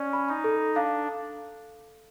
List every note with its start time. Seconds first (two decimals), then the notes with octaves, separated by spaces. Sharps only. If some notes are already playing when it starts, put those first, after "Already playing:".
Already playing: C#4 D5
0.13 B5
0.29 D#4
0.44 A4
0.75 D4 F5